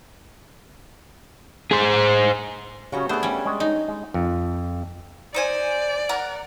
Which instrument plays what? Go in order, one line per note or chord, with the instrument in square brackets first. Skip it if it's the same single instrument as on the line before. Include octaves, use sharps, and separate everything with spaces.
[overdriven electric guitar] G#4 C5
[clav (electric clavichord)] C#3 C#4 [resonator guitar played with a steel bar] F#3 F#4 G4
[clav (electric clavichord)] A3 B3 [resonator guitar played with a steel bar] D4 G#4 [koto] C5
[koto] G3 C#4
[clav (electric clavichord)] G#3 C#5
[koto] D#4
[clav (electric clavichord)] G#3
F2
[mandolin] D#4 C5 G#5 [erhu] D5
[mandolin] A#4 F#5